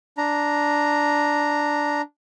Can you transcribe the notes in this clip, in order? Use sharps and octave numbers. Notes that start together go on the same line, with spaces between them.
D4 A#5